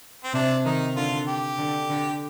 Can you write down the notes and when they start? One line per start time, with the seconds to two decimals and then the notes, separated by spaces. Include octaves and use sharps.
0.24 C4
0.34 C3 D4
0.65 D#3 D#4
0.96 D3 F4
1.27 G4
1.58 D3
1.90 D3